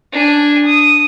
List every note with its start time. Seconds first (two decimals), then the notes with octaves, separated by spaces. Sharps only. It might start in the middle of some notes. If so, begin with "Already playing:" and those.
0.12 D4 G#5
0.65 D#6